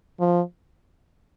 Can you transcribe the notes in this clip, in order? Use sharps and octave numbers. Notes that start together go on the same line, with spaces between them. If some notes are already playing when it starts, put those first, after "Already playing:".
F3